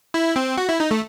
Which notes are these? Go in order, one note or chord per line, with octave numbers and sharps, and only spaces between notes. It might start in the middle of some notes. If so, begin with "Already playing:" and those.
E4
C4
F#4
E4
D#4
A3